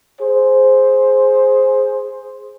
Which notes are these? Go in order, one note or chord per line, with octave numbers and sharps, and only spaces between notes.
G#4 C5